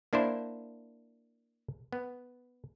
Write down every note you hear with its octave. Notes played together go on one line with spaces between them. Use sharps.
A#3 D4 E4 C5
B3